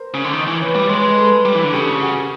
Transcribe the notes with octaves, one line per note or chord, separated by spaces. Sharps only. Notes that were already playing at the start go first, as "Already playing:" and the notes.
Already playing: A#4 C5
C#3
D3
D#3
E3
B4 C#5
G3
G#3 B4 C#5
A4 B4
G3
E3
D3
C#3 G4 A4
F#4 G#4